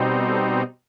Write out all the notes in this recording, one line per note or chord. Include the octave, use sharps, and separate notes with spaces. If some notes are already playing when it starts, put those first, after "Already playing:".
Already playing: B2 G3 C4 D#4
A4